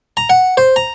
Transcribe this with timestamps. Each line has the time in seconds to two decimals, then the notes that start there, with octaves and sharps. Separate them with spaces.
0.17 A#5
0.30 F#5
0.57 C5
0.76 A#5